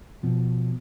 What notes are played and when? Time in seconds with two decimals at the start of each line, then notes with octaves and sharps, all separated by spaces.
0.23 B2 F3